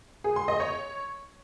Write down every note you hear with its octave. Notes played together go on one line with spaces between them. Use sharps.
G#4
C6
D#5
C#5